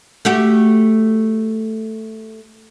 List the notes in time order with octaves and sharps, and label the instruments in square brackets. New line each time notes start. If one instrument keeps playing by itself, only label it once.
[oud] A3 F#4 G4